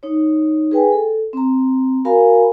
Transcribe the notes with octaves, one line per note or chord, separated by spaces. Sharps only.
D#4 C#5
G#4 B4 G5 G#5
A4
C4 A#5
F#4 A#4 F5 G#5 A#5 B5